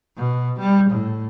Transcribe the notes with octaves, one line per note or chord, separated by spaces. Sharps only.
B2
G3
A2